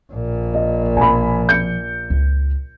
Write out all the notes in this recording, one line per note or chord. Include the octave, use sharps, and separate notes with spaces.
A#1 A#2
D#5
B2 F3 G#5 B5
G6 C#7
C#2